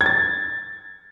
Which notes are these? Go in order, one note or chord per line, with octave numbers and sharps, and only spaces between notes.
G#6
A6